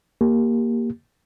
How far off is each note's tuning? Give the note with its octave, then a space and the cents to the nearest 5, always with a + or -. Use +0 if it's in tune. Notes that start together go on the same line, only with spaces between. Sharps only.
A#3 +0 G4 +0